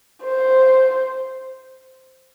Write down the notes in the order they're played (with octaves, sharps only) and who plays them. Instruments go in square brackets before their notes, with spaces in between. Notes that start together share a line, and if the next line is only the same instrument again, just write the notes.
[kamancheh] C5